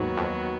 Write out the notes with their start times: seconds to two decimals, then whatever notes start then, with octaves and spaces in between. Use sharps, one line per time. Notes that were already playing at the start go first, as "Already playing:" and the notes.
Already playing: D#2 G#2 D#3 F#3 B3 F#4
0.17 F2